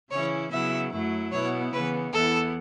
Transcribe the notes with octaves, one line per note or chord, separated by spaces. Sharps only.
C#3 E3 C#4 E4 C#5
C#3 F#3 B3 E4 E5
F#2 F#3 A3 E4
B2 B3 E4 C#5
C#3 E3 B3 B4
E2 E3 B3 E4 A4